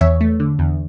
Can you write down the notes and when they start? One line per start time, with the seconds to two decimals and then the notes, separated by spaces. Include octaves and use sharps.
0.01 E2 C#5 E5
0.21 A3
0.40 D3
0.59 E2